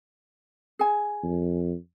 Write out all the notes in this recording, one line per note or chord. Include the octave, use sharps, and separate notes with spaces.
G#4 G#5
F2